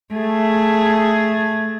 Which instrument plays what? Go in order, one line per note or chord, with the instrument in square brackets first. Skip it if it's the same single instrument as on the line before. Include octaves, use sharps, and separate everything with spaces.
[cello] A3 G#4